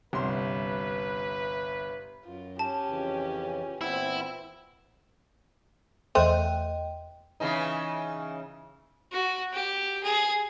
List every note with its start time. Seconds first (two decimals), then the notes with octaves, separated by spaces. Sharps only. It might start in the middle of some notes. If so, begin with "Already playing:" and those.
0.13 G1 C2 B4 C6
2.25 F#2 F4
2.59 C#4 G4 A5
2.88 F2 C#3 E3
3.81 A#2 E3 B3 C4 E4
6.15 E2 A3 C5 D#5 G5 F#6 D#7
7.40 C#3 E3 D#4
9.12 F#4
9.53 G4
10.03 G#4